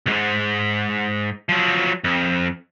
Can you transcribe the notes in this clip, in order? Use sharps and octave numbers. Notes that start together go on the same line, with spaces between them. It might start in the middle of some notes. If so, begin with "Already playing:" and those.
B1 G#2
F3 F#3
F2